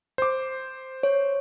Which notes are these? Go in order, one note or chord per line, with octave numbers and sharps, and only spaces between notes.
C5 D6
C#5